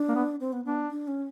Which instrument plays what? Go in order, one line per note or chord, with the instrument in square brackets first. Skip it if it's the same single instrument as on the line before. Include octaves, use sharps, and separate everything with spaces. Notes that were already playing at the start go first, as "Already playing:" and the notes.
Already playing: [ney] D4
[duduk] A#3
B3
[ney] C4
B3
[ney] B3 [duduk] D4
[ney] D4
C#4